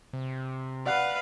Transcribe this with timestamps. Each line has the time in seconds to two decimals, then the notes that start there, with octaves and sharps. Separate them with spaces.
0.13 C3
0.86 B4 D5 F5 F#5 F#6